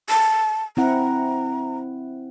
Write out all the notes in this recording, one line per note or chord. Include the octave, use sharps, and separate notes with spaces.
A5
C4 E4 F#5 A#5